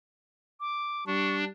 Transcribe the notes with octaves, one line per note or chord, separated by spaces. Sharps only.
D6
G3 D4 C#6